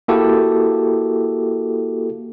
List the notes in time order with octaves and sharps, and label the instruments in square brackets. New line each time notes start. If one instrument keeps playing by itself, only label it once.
[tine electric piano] A#3 E4 F#4 G4 A4